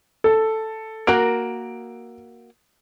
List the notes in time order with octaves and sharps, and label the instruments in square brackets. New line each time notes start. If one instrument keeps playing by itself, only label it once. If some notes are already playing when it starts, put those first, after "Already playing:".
[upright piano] A4
[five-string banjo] A#3 F#4 A#4 [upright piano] D7